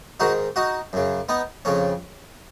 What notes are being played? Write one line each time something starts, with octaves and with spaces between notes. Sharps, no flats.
G#2 D#3 D#4 F#4
D#4 F#4
F#2 C#3
B3 D#4
F2 C#3 C#4